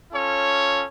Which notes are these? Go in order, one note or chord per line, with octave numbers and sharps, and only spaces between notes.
C#4 F4 A4 C#5